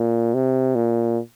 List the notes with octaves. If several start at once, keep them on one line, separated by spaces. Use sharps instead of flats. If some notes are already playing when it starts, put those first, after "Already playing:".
Already playing: A#2
C3
A#2